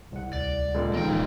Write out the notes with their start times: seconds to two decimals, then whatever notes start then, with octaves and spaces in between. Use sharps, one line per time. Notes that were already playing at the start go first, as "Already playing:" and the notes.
0.12 C2 F#5
0.33 D2 D5
0.74 C#2 A#2 G#3 A4 B4
0.94 C#2 C3 D#3 E3 A#3 G5
1.08 D#1 A#2 E3 G#3